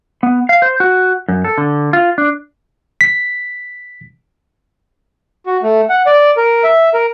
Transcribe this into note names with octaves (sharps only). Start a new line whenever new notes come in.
B3
F5
C5
F#4
F#2
A4
D3
F4
D4
B6
F#4
A3
F#5
D5
A#4
E5
A#4